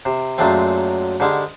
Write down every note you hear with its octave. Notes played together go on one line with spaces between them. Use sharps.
C3
F#2 A#2 F#3 G#3 A3 C4
G#2 D3 G3 G#3